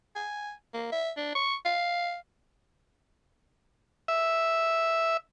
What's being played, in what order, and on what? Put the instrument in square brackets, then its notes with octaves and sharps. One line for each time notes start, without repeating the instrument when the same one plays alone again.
[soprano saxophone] G#5
A#3
E5
D4
C#6
F5
[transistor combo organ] E5